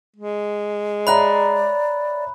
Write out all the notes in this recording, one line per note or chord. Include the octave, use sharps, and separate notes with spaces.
G#3
C#5 D5 E5 A#5 B5 F#6